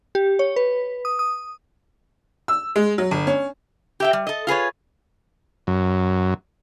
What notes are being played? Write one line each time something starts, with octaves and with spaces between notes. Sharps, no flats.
G4
C#5
B4
D#6
D#6
E6
G#3
F#3
G1
C#4
G4 E5 G5
G3
A4 D#5
F4 G#4 B4 C#5
F#2